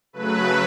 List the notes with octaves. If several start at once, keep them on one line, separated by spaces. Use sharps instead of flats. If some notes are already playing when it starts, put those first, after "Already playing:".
C#3 F#3 A3 B4